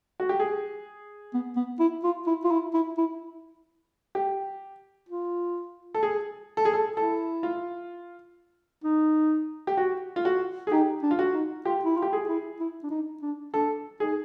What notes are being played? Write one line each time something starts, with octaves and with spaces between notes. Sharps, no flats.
F#4
G4
G#4
B3
B3
E4
F4
E4
F4
E4
E4
E4
G4
F4
A4
G#4
A4
G#4
A4
E4 A4
F4
D#4
G4
F#4
F4
F#4
G#4
D#4 G4
D4
F4
F#4
D#4
F4 G4
E4
F4
G4
G#4
E4
E4
D4
D#4
D4
D4 A4
D#4 G#4